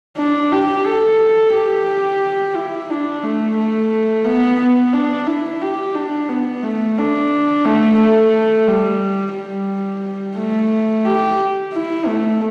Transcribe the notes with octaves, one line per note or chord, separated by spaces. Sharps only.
D4
G4
A4
G4
E4
D4
A3
A3
B3
B3
D4
E4
G4
D4
B3
A3
D4
A3
A3
G3
G3
A3
G4
E4
A3